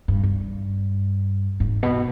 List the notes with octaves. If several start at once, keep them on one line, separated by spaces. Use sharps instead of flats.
G2
G2
G#2
B2